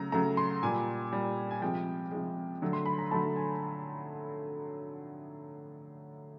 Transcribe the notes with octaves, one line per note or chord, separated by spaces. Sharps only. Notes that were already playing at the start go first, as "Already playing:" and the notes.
Already playing: C#3 F#3 A3 A#5
C#3 F#3 A3 A#5
C6
A#2 G3 G#5
A#2 G3
G#5
C3 F3 G#3 G5
C3 F3 G#3
D3 F#3 A3
C6
B5
A#5
D3 F#3 A3 A5
G#5